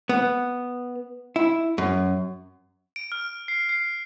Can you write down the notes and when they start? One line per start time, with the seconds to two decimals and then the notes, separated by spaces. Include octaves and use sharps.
0.09 B3
1.36 E4
1.78 F#2
2.96 D7
3.12 F6
3.48 C7
3.69 C7